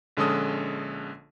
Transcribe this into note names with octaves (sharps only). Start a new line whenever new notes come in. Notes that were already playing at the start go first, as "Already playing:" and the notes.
A#1 D3 G#3 C#4 A4 D#6